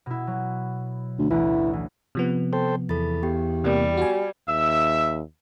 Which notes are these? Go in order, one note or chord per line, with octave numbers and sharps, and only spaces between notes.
B2 E4
F#3
D2
A1 D2 E3
E3
C3 F3 B3
A4 C5 G5
E2 A4 B5 A6
B3 G4 G5
C3 G3 A#3
F#4 G#5
D#2 E5 E6